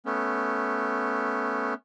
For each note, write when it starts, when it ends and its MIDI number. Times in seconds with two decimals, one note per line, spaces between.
0.06 1.74 57
0.06 1.74 59
0.06 1.74 61